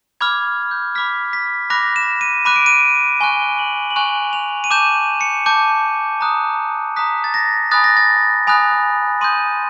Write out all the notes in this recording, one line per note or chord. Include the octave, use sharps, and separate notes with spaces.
B5 D6 F6 G#6
G6
B5 D6 F6 B6
B6
B5 D6 F#6 A#6
E7
D#7
B5 D6 F#6 D#7
D7
D#7
G#5 C#6 F#6 G7
F#7
F#7
G#5 C#6 F#6 F7
F7
D#7
A5 D6 G6 E7
C#7
A5 D6 G6
A#5 D#6 F#6
A#5 D#6 F#6 B6
A6
A#6
G#5 B5 D#6 F#6 A6
A#6
A6
G#5 B5 D#6 F#6
C6 D#6 G6 D#7